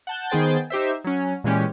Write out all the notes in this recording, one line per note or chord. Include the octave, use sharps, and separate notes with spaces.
F#5 A5 G6
D#3 B3 G#4 C5 G5 A6
D#4 G4 C5 E5
F#3 C#4
A#2 E3 G#3 C#4 G4